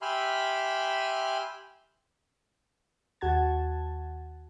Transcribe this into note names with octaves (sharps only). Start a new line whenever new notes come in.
G4 E5 G#5 B5 C6 F6
D#2 F#4 F#5 A5 G#6